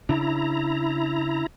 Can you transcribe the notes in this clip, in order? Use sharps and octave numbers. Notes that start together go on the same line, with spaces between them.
C#3 D4 E4 A#5